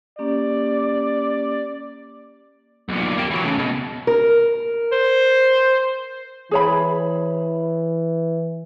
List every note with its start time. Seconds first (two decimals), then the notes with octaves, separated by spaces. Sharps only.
0.19 A#3 C#4 G4 D5
2.89 B1 A#2
3.17 A#3 G4
3.30 E3 F#3
3.44 A2 C#3
3.58 B2
4.07 A#4
4.92 C5
6.51 E3 G#4 C#5 B5